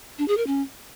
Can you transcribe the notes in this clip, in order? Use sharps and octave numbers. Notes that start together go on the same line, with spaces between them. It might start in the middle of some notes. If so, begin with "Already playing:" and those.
D4
G#4
A#4
C#4